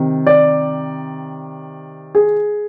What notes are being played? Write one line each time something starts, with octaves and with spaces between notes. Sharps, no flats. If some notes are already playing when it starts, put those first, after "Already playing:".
Already playing: C3 D#3
D5
G#4